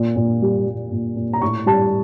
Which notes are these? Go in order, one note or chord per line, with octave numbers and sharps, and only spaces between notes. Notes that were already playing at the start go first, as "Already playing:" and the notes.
Already playing: A#2
A#2
G3
G3
A#2
A#2
A#5
A2 C#6
G3 A5